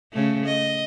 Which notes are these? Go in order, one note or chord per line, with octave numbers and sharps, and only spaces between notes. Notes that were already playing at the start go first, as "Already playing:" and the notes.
C#3 A3
D#5